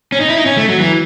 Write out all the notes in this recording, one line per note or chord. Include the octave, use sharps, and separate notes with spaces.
C#4
D#4
E4
D#4
C#4
A3
F#3
E3